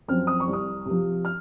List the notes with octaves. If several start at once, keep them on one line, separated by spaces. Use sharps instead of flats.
F#2 F3 C4 F6
D#6
C#6
C2
D#6
C3 F3
F6